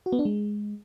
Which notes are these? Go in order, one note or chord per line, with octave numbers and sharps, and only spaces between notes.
F#4
B3
D4
G#3